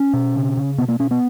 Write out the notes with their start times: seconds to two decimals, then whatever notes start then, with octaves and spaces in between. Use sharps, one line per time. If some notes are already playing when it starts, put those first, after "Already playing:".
Already playing: C#4
0.13 B2
0.36 C#3
0.57 C#3
0.78 B2 B3
0.88 A#3
0.99 B2 C#4
1.11 B3